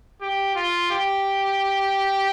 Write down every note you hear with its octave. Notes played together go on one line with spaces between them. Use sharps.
G4
F4
G4